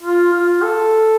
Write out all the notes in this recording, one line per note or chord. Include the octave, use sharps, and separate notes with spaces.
F4
F4
A4